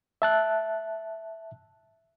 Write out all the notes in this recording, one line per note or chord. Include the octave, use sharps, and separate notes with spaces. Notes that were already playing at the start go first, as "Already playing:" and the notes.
E5 A5 F#6